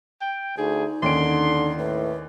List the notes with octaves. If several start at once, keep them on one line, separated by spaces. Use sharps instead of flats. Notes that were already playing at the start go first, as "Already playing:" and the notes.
G5
D2 D#4 G#4
D#2 D3 C#4 C6 D7
A2 B4